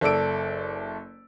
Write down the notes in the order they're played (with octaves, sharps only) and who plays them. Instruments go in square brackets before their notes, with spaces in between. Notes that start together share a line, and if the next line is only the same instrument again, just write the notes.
[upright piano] F#1 A4 D5 E6 D7